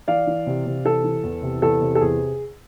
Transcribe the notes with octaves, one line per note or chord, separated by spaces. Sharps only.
E3 D5 F5
E3
C3
C3
E3 A4
E3
E2
C3
E2 A4
C3
A4
E2 G#4